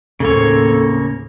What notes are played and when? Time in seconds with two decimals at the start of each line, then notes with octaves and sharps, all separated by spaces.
0.20 D#2 A2 C#3 A#3 C4 A4 C#5